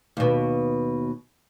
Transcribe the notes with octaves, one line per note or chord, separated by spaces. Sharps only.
D#2 B2